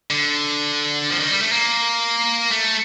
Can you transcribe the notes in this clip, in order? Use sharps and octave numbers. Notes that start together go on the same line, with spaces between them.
D3
F3
D#3
G3
A3
A#3
A3